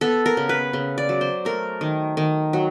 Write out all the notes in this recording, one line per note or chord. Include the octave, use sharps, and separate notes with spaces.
B3 A4
A#4
C#3
B4
C#3
D5
F#3
C5
A3 A#4
D#3
D#3
F#3